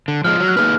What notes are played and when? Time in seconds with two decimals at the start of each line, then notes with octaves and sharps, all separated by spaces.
0.08 D3
0.24 F3 G#3 F6
0.40 F#3
0.48 F#6
0.57 A#3 D#4 G#4 B4 F6